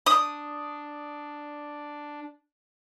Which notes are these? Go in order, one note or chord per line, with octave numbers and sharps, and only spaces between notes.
D4 D#6